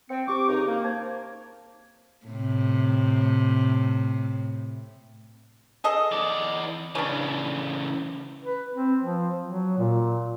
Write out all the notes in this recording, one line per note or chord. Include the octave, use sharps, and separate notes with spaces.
C4 C#7 D7
C4 G4 C#6 D6
C#2 D#4
A#3
C5 A5 G#6
A2 C3
G#4 A4 D#5
E3 D5
C#3 E3 C#4 D4
B4
C4
F3
F#3
A#2